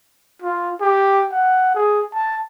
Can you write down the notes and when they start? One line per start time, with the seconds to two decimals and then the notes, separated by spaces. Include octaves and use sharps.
0.42 F4
0.81 G4
1.32 F#5
1.75 G#4
2.14 A5